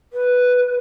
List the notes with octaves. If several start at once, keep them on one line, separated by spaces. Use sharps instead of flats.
B4